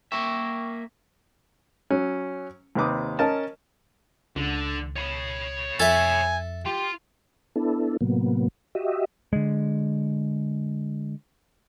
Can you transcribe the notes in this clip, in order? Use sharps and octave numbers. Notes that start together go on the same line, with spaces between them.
A#3 A#4 E5 G5 C#6
F#3 C#4
D#2 C3 B4 D6 D#6
C#4 A#4 D#5 A5
C#2 D3
C#5 B5
F2 A4 E5 G#5
F4 G4 C6
B3 D4 E4 A4
A2 C3 F#3 A#3 B3
F#4 G4 D#5 E5
D3 G#3